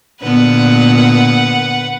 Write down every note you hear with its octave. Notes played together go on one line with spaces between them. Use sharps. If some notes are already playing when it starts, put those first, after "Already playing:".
A#2 D3 B3 B4 F#5